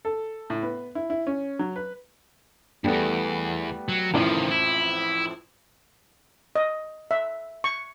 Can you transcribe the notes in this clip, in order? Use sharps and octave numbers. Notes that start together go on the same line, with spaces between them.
A4
A2
B3
E4
E4
C#4
F#3
B4
E2 G2 G3 A3 B3
F#3
A1 F2 A2 D#3 F3
E4
D#5
E5
C#6